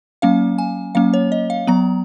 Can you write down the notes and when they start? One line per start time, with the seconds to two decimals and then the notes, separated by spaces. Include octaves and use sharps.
0.22 F#3 A#3 C#4 F5
0.58 G#5
0.95 F#3 A#3 C#4 F5
1.14 C#5
1.32 D#5
1.50 F5
1.67 F#3 B3 A#5